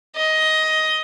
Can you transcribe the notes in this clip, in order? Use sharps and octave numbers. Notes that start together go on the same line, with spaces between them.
D#5